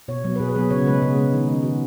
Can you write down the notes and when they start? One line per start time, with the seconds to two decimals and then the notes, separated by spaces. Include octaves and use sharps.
0.08 B2 C#5
0.24 F#3 B3
0.36 B4
0.40 B2 G#4
0.49 B4
0.55 F#3 B3 G#4
0.70 C#3 C#5
0.86 G#3 B3 B4
1.02 C#3 G#4
1.17 G#3 B3
1.33 D#3 D#4
1.48 G#3 C#4
1.63 D#3 F#4